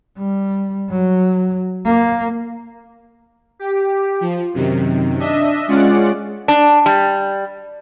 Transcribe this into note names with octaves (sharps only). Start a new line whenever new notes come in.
G3
F#3
A#3
G4
F3
F#2 C3 D#3
D4 D#5 E5
G#3 C#4 F4 D5 F#5
D4
G3